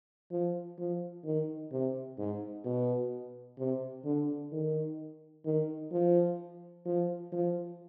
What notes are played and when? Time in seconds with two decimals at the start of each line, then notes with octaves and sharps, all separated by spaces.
0.31 F3
0.78 F3
1.25 D#3
1.72 C3
2.18 G#2
2.65 B2
3.58 C3
4.05 D3
4.52 D#3
5.45 D#3
5.92 F3
6.86 F3
7.32 F3